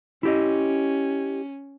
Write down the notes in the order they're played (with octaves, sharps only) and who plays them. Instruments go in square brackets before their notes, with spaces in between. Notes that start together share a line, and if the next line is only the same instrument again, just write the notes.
[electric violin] C#4 [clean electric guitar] E4 G4 D#5